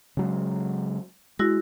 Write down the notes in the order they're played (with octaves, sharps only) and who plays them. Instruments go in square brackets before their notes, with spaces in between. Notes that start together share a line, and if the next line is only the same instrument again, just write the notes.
[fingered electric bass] C#3 F#3 G#3
[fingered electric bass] G#3 [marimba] E4 F#4 A#6